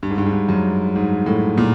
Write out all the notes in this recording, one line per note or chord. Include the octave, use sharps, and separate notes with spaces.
G2
G#2
G2
G#2
G2
F#2
G#2
A2
A#2